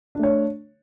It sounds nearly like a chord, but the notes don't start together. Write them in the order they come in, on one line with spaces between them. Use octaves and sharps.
D4 A3 C#5